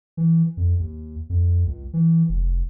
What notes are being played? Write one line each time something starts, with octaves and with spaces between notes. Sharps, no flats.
E3
F2
D#2
F2
C#2
E3
F1